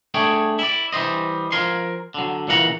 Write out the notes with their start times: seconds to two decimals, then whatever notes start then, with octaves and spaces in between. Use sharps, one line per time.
0.14 A3 D4 G#4 C#5 G5
0.59 E4 D5
0.92 E3 G3 C5 D#5
1.52 F3 A#4 G#5 C6
2.14 D3 F#3
2.48 A#2 C#3 E3 F#5 A#5